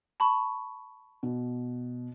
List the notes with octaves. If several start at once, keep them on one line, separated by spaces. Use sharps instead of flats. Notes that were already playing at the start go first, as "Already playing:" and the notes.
A5 B5 C#6
B2